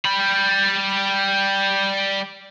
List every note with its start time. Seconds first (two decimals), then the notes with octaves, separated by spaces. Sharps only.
0.05 G3 B5